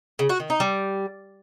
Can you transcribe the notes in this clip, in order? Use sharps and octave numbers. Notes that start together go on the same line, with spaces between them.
C#3
F#4
D#3
D#4
G3